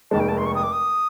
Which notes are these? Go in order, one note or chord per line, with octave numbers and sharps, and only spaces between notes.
F1 D#2 D#3 G#3 A5
G5
A5
C6
C#6
D#6
D6
D#6